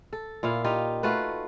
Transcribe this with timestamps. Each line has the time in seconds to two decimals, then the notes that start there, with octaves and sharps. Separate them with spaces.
0.13 A4
0.43 A#2 E4 F4 F5
0.64 D#4 F4 G4
1.03 A3 F4 F#4 B4